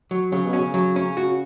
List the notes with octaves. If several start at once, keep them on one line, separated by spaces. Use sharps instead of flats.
F#3
C#3 F#3
B2
C#4
C#3
F#3
C#4
F#4